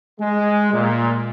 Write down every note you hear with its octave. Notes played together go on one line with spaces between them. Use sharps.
G#3
A#2